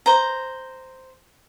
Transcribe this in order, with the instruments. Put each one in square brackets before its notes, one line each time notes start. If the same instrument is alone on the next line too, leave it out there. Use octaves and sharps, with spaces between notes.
[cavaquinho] C5 A#5